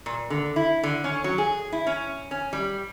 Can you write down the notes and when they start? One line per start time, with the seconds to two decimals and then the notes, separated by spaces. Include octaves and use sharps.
0.06 A#2
0.30 D3
0.56 E4
0.83 D3
1.04 C#4
1.24 F#3
1.38 G#4
1.72 E4
1.87 C#4
2.31 C#4
2.53 G3